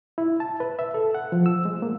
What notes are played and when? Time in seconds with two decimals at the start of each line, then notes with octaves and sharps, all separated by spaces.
0.18 E4
0.40 A5
0.60 B4
0.79 E5
0.94 A4
1.15 F#5
1.32 F3
1.46 E6
1.65 G#3
1.82 A#3